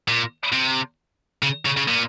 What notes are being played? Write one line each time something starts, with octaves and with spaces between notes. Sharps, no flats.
A#2
C3
C#3
C#3
C#3
A#2